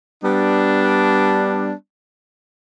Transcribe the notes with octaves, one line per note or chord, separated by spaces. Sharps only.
G3 B3 D4